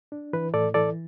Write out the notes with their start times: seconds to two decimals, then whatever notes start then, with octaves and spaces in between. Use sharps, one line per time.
0.12 D4
0.33 E3 B4
0.54 A2 A4 D5
0.74 E3 A4 D5